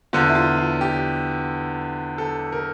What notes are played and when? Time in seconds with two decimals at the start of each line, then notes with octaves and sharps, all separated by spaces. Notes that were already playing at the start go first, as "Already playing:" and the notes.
0.13 E2 D3 F4
0.29 E4
0.35 F4
0.59 F4
0.81 G4
2.18 A4
2.53 A#4